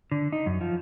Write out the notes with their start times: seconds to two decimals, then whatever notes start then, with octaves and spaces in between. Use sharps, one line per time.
0.11 D3
0.32 D#4
0.46 F#2
0.61 F3